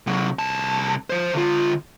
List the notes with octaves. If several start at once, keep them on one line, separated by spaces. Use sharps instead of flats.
C3 F#3
C2 A5
F3 C5
D3 F4